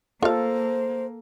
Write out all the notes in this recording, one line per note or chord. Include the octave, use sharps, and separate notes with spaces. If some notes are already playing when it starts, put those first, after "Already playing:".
A#3 F4 A4 C5 F5